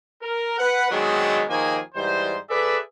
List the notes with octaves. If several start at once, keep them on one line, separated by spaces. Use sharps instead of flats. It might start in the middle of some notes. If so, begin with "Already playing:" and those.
A#4
B4 F#5
D#3 F#3 G#3 B3 C4 D4
D#2 D#3 F3 A#3 G#4 G#5
G#2 E3 G3 C5
G#4 A4 B4 D5 E5